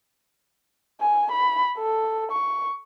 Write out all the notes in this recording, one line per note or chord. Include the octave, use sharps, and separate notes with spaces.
G#5
B5
A4
C#6